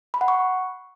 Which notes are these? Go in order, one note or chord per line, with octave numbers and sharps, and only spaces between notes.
B5
F#5
C#6